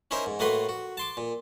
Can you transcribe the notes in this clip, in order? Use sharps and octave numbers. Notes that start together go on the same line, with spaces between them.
C#4 D#4 E4 A#4 C5
G#2
A2 A3 A#3 F#4 B4 C6
F#4
A5 C6 D6
A#2